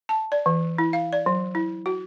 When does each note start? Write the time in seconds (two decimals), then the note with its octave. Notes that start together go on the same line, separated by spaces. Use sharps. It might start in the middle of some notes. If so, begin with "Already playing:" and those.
0.09 A5
0.32 D5
0.46 E3
0.78 E4
0.93 F5
1.13 D5
1.26 F#3
1.55 E4
1.86 F#4